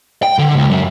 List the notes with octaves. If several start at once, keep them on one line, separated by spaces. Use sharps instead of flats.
G5
D3
C#2
F#2